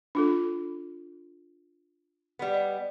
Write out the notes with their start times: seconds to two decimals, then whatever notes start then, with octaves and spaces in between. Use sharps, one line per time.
0.15 D4 F4 A4
2.39 G3 B3
2.54 D#5